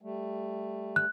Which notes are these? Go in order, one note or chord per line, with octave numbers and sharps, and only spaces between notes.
G3 A3
F#6